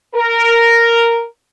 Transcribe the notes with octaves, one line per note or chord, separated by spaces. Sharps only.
A#4